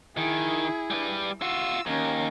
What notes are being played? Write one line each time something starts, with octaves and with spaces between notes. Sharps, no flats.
D#3 E4 G#4
G3 B4
F4 F#4 E6
D#2 C#4 A#4